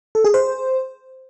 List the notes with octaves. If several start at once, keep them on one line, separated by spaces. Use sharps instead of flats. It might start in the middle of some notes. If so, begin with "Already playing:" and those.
A4
G#4
C5